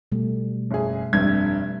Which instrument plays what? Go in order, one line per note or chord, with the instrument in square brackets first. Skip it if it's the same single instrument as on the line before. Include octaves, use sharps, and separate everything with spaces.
[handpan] B2 G3 A3
[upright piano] F#1 G#4
[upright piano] F1 G2 G#6 [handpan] G3 E5